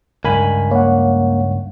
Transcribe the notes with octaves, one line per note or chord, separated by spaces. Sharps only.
C#2 G2 A#4 G#5 B5
A#3 C#5 F#5